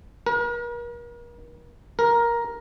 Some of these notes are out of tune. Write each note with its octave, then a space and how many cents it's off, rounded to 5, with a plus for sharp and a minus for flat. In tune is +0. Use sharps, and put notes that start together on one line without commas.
A#4 +40
A#4 +10